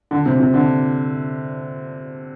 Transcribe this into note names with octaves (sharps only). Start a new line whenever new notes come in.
D3
C3
C3
D3